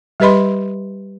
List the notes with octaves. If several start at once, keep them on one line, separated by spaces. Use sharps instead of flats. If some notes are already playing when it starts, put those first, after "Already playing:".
G3 G4 B4 D#5 B5 C6